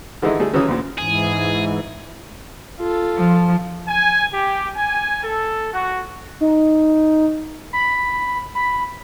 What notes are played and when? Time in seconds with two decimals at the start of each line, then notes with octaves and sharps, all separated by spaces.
0.22 D3 E3 G#3 D#4 E4
0.40 G3 A3 G#4 A4
0.53 C#3 E3 F#3 C#4 D#6
0.68 D2 A#2
0.98 G#2 E3 G#4
2.80 F4 A4
3.18 F3
3.87 G#5
4.31 G4
4.75 G#5
5.22 A4
5.73 F#4
6.41 D#4
7.73 B5
8.55 B5